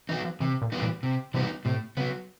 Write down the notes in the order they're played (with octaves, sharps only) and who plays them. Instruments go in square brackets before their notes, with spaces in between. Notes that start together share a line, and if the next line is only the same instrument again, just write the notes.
[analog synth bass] E3 [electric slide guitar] F#3 B3 D#4
[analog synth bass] F3
[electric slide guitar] C3 [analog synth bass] E3
[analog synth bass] A#2
[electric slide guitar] E3 G3 B3 D#4
[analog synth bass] A#2
[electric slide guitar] C3
[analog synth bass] C3 [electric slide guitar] E3 G3 B3 D#4
[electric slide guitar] A2 [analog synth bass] C3
[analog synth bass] C#3 [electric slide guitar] F#3 B3